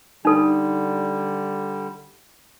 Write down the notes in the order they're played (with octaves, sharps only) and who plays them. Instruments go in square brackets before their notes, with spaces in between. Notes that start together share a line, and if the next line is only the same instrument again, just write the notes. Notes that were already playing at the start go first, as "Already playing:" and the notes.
[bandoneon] D3 G3 [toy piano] D#4 A4